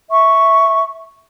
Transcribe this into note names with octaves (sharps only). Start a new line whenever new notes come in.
E5 C#6